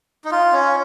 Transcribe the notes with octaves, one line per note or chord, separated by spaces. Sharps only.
D#4
F4
C#4